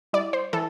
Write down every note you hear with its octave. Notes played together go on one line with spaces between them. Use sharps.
G3 E4 D5
C5
E3 A4